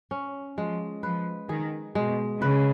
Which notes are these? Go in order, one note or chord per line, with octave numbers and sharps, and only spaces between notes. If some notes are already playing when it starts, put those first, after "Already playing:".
C#4
F3 G#3
F3 B4
D#3 G#4
B2 G#3
C#3 B4